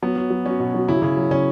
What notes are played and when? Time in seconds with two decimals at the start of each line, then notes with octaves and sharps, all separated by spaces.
0.02 F#3 B3
0.16 F#3
0.30 F#3
0.46 F#3 C#4
0.60 B2
0.74 F#3
0.88 C#3 E4
1.02 C#3
1.17 F#3
1.31 C#3 C#4